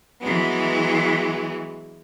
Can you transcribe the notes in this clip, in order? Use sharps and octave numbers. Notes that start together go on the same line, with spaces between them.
E3 F#3 G#3 B3